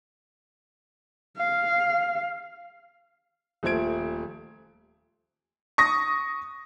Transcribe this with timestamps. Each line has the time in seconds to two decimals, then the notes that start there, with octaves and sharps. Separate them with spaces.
1.37 F5
3.63 D#1 F3 A3 C5 G#6 D7
5.78 C#6 D#6 A#6